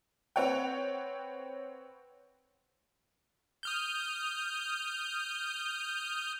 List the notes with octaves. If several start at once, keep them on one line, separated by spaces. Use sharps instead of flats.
C4 B4 C#5 F#5 G5
D#6 F6 G6